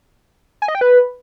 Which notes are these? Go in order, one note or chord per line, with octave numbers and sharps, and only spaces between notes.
G#5
D#5
G5
B4